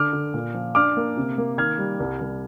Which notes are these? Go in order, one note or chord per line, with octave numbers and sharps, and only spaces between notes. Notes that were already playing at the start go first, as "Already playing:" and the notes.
Already playing: D3 D6 F6
D3
A#2
F3
D4 D6 F6
A#3
C3
A#3
D#3 F6 G#6
G3
C2
C2